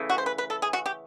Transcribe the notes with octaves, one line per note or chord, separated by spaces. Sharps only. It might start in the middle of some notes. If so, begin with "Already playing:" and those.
Already playing: C#3 E3 A3
F#4
C5
B4
B4
A4
G#4
F#4
G4